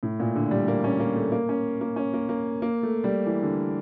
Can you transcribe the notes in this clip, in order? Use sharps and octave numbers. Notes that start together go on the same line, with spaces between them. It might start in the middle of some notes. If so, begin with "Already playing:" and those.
A2
A#2
D3
G3
A#3
C#4
A#3
A3
A#3
C#4
A#3
C#4
A#3
A#3
A#3
A3
G3
E3
D3